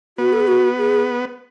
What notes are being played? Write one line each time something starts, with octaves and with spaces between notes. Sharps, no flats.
B3 F#4
A4
G#4
F#4
G#4